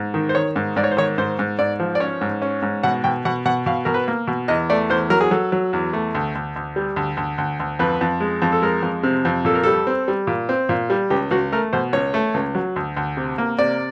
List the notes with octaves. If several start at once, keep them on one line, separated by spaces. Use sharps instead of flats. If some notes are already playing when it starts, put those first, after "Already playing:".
Already playing: G#2
D#3
C5
D#3 C#5
G#2
G#2 D5
C#5
C5
D#3 C#5
G#2 C5
G#2
G#2 D5
F3
D5
C#4 C#5
G#2
C#4
G#2
B2 F#5
B2 G5
B2 F#5
B2 F#5
B2 F5
B2 A#4
B4
A#3
B2
E2 D#5
A3 D5
E2 C5
F#3 A#4
G#4
F#3 A4
F#3
E2
A3
D2
D2
D2
G3
D2
D2
D2
D2
F2 B4
F2
G#3
F2
A4
G#3 A#4
F2
C3
F2
A#2 A4
A#4
G3 A4
C4
G3
A#2
C4
A#2
G3
C#2 G4
C#2 F#4
A3 A#4
B2 C5
C#2 C#5
A3
C#2
F#3
D2
D2
C3
A#3
C3 D5